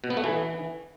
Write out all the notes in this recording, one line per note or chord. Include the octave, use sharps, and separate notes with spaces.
B2
B3
A3
E3